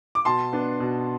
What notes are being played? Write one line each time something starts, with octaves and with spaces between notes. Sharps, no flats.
D6
B2 A5 C6
B3 D4
B2